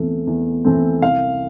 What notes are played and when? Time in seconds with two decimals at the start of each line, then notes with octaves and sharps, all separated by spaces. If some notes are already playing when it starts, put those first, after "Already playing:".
Already playing: E2 E3 A3 C4
0.27 E2
0.65 E3 A3 C4
1.02 C2 F5